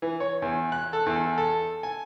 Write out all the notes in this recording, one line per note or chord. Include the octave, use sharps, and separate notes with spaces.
E3
C#5
E2
F#6
A4
E2
A4
G#5